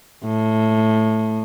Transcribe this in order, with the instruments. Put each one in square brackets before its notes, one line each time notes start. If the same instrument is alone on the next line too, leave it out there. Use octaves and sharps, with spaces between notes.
[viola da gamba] A2